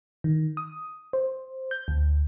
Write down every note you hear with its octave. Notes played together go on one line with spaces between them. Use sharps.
D#3
D#6
C5
G6
D2